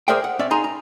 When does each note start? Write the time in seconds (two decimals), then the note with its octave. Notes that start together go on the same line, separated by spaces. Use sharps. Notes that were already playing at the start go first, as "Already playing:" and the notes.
0.08 G#4 A#4 C5 D5 E5 G5
0.24 F#5
0.39 C4 C#4 D5 E5
0.51 D#4 G#4 G#5 A#5 C6
0.64 A#5